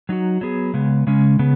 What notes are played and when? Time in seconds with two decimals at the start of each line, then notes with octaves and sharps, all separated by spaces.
0.09 F#3 D#4 F#4
0.41 F#3 B3 G#4
0.74 C#3 G#3 B3
1.07 C#3 G#3 C#4
1.39 C#3 B3